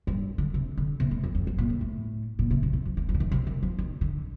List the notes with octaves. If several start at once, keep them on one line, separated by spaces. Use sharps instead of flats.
G2
D3
C3
D3
C3
A2
F2
F2
G2
A#2
C3
A2
A#2
C3
D3
D#3
F3
D#3
F3
D3
D#3
C3
D#3
F3
D#3
D3